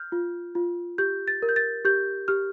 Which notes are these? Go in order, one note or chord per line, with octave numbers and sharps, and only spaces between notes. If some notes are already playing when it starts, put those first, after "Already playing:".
Already playing: F6 G6
F4
F4
G4 G6
A6
A#4
G6
A6
G4 G6
G4 F6